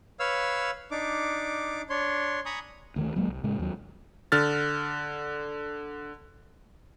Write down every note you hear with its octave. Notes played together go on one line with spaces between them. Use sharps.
B4 C#5 F5 E6 F6
D4 D#4 D6
D4 C#5 C6
G#5 A#5 B5 C#6 D#6
D2 D#3 A3
D1 F#3 G#3 A#3
C2
A2 C#3 G#3
D#2 F#3
D3 F6 A6